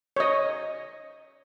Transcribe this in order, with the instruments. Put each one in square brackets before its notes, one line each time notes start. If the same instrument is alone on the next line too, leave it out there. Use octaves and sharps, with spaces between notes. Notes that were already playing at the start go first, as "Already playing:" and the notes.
[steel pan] C#5 D#5